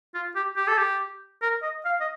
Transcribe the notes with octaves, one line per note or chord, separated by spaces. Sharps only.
F4
G4
G4
A4
G4
A#4
D#5
F5
D#5